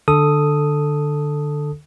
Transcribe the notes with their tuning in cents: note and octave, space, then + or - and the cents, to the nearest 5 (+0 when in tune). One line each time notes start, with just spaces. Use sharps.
D3 +20 A4 +0 D#6 +0